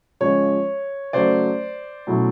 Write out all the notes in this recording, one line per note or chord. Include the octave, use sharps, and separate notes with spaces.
C#3 F3 G#3 C#5
C#3 F#3 A3 C5 D5
B2 F#3 A3 C#4 E4